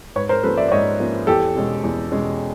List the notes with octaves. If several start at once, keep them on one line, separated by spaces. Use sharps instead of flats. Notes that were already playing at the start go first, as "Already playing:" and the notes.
G#2 B4 C#5
A#4 C5
F3 A#3 C#4 A4 B4
D5 E5
D5
G#2 C#5 D#5
F3 A#3 C#4
E2 G4 A4
B2 G#3 C#4
E2
B2 G#3 C#4